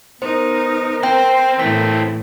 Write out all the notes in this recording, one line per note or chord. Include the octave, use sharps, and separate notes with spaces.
B3 D#4 A#4 C5
C4 C5 G5
A2 E3 A3 C4 B6